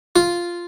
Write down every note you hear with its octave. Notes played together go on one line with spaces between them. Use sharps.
F4